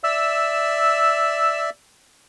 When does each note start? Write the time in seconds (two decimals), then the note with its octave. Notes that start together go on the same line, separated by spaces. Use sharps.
0.04 D5 E5 E6